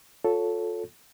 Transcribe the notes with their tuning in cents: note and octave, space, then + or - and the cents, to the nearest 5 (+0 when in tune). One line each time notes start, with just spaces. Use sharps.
F4 +30 A4 +0 C#5 +10